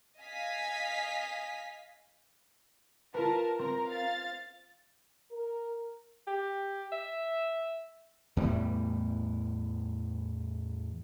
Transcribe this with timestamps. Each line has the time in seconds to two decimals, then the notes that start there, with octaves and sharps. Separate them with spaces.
0.20 D#5 F5 G#5 B6
3.14 F4 A#4 B4 A5
3.59 C4 A#4 A#5
3.91 F5 A6
5.31 A#4
6.27 G4
6.92 E5
8.37 E2 A2 E3 G3